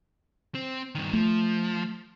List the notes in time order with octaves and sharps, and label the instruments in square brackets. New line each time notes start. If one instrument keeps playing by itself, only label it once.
[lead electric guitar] C4
G2 D#3
[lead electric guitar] F3 [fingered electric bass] A3